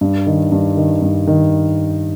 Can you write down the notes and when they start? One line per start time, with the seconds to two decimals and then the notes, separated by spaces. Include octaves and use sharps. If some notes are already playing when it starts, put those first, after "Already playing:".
0.01 G2
0.27 D#3
0.52 G2
0.77 D#3
1.02 G2
1.27 D#3